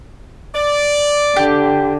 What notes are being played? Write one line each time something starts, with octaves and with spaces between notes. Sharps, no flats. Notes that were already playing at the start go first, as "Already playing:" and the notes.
D5
D3 G4